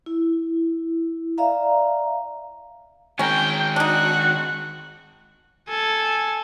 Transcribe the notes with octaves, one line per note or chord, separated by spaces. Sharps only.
E4
D5 E5 F5 A#5
D#3 G#3 C#4 A#4 G5
D4 D#4 F#4 F#6
A4 G#5